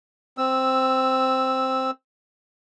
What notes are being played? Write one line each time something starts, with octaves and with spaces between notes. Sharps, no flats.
C4 E6